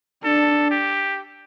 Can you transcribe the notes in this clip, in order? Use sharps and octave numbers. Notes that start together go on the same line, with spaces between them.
D4 A4
G4